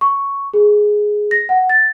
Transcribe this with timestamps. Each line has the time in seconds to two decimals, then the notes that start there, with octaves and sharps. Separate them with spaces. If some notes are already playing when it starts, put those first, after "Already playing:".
0.01 C#6
0.54 G#4
1.31 A#6
1.49 F#5
1.69 A6